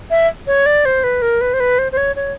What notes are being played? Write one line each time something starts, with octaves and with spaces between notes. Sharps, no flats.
E5
C#5
D5
C5
B4
A#4
B4
C5
B4
C5
C5
C#5
C#5